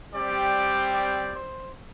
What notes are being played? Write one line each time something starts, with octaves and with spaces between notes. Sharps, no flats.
G3 C4 G4 D5
D5
C5